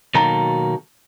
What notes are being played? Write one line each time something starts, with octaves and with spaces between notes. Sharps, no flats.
B2 D#3 F#3 A#3 A4 A#5